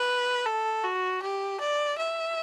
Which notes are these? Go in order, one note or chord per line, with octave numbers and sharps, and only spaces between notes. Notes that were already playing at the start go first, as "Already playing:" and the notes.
Already playing: B4
A4
F#4
G4
D5
E5